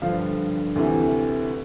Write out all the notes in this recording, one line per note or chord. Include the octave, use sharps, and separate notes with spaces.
G2 D3 F3 F5
D2 C3 E3